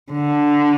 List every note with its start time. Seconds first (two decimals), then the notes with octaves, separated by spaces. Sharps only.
0.12 D3